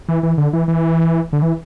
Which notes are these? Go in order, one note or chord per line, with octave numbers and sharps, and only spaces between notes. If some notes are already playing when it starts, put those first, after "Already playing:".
E3
E3
D3
E3
E3
D3
E3